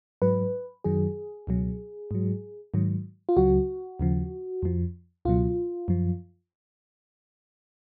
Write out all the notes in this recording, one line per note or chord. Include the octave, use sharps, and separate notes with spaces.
G#2 F#3 B4
F#2 D#3 F#3 G#4
C#2 B2 F#3
G#2 F#3
G#2 D#3 F#3
F4
C#2 C#3 F#3 F#4
D#2 C#3 F3
F2 F3
C#2 B2 F#3 F4
F#2 F3